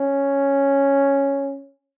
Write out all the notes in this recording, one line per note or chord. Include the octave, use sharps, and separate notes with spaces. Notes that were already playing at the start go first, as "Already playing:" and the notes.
Already playing: C#4